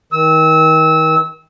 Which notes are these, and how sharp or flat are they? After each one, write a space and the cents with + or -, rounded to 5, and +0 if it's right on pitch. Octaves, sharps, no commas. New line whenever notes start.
D#3 +30 E6 -25